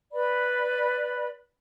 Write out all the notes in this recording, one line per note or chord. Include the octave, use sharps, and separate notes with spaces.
B4 D5 B5